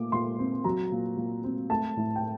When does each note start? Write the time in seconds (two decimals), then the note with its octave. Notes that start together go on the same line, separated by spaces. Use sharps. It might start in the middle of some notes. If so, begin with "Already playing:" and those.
Already playing: A#2 A3 D6
0.12 A#2 C6
0.39 C4
0.64 F#3 A#5
0.92 A#2
1.17 A#2
1.44 C4
1.70 A3 A5
1.97 A2
2.16 G5